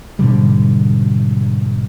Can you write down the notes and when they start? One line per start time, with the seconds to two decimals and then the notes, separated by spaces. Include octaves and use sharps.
0.19 G#2 B2 D3 G3